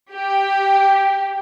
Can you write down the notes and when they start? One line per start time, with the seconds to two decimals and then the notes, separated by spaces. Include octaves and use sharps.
0.13 G4